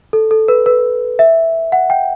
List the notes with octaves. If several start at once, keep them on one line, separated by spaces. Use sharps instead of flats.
A4
A4
B4
B4
E5
F#5
G5